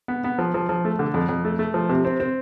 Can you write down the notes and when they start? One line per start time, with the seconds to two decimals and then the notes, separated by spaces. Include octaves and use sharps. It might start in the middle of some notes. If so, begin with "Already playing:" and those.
0.08 B3
0.24 B3
0.39 F3
0.54 F3
0.69 F3
0.85 A3
0.99 D3
1.14 F2
1.29 F2
1.45 A3
1.59 A3
1.74 F3
1.90 C3
2.05 C4
2.20 C4